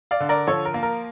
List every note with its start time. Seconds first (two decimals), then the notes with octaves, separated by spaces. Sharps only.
0.11 D5 F5
0.20 D3
0.29 A#4 D5
0.47 F3 A4 C#5
0.65 A#4
0.74 A#3
0.83 A#4